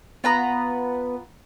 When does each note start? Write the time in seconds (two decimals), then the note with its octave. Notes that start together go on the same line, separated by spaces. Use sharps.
0.24 B3 F4 B4 A#5